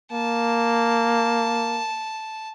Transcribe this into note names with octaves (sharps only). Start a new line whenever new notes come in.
A#3 A5